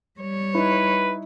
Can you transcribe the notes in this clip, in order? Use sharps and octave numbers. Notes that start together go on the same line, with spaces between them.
G3 C#5
D#4 E4 B4